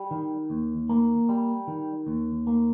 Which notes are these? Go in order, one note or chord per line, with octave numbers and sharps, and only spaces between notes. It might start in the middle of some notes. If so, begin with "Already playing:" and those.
Already playing: G3
D#3
D#2
A#3
G3
D#3
D#2
A#3